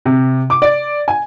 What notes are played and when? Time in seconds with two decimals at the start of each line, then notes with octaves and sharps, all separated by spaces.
0.06 C3
0.50 D6
0.62 D5
1.08 G#5